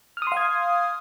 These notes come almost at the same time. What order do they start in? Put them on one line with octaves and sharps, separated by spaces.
F6 D#6 C6 F5 G#6